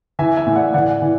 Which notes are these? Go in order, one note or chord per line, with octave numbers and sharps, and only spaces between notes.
E3 E5 G#5
E5 G#5
A2
D5 F#5
E3 D5 F#5
E3